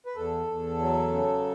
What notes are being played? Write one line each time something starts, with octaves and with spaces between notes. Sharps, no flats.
B4
E2 A4
E2
F#3
C#3